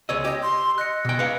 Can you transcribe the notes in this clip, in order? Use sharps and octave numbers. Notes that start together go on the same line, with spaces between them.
C#2 C#5 D#5 E6
G4 D#5
C6
D#5 F#6 C#7
B2 G5
B4 F5 C#7